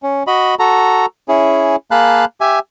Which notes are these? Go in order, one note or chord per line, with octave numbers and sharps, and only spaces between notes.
C#4
F#4 D#5 B5
F#4 A4 A#5
C#4 E4 G#4
A#3 G#4 F5 A5 B5 F#6
G4 E5 G#5